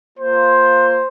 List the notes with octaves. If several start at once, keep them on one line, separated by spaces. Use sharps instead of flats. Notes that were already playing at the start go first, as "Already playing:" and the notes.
A#3 F4 C5